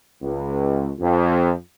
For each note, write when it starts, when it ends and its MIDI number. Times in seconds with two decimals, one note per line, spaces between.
0.22 0.89 37
1.00 1.51 41